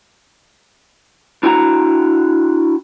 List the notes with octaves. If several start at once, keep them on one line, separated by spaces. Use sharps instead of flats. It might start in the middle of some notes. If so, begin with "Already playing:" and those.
D4 E4 F#4 G5 G#5 A#5